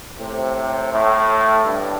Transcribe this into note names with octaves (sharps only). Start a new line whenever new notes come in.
A2 C3
A2
G2